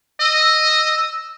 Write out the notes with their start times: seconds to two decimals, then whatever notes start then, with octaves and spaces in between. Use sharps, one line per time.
0.21 D#5 E6